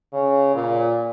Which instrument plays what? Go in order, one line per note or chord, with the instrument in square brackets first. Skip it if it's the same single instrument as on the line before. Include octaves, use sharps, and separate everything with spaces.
[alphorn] C#3
A#2